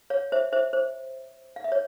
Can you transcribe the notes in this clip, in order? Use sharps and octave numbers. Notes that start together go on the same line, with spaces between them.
C#5 F5
C5 E5
C5 E5
C5
F5
E5
C#5